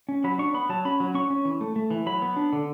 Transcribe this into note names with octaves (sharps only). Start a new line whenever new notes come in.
C#4
F#3 B5
D4 C#6
B3 B5
F#3 A5
C#4 B5
F#3
C#4 C#6
C#4
E3
A3
A3
E3
F#3 B5
B3
D4
D3